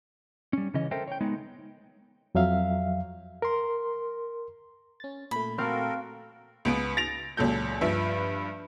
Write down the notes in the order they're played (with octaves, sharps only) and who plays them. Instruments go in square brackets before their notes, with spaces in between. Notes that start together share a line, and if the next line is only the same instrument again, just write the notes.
[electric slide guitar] G3 C#4
C#3 E3 C#4 D#5
A4 A#4 C5 E5 G5
C#5 G5
G#3 B3 D#4
[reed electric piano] F2 F#3 E5 F5
A#4 C6
[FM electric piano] C#4 A6
[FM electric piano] A#2 A3 [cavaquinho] B5
[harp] C4 F5 [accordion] F#4 A4 A#4
[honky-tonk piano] C#2 B3 D7
A6 A#6 D7 F7
C#2 A#2 F#3 A4 G6
G2 F3 B4 E5